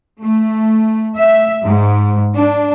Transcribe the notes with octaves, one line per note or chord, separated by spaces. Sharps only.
A3
E5
G#2
D4